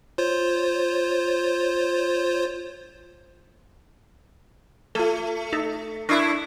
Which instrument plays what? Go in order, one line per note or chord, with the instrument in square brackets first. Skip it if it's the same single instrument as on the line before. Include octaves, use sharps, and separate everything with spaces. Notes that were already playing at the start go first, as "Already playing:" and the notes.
[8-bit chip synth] F4 C5 C#5
[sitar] A3 [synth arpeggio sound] F4 A4
[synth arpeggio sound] D#4 A4 E5
[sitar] D4 E4 [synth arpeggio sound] A#4 C#6 D#6